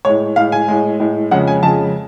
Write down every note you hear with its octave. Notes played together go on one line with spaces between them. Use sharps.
A2 G#3 C#5
A2 G#3 F5
G#5
A2 G#3
A2 G#3
F2 C#3 G#3 F#5
G#5
F2 C#3 G#3 A5